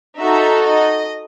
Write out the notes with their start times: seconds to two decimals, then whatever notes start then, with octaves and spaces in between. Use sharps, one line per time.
0.19 D#4 F#4 A4 E5
0.63 D#5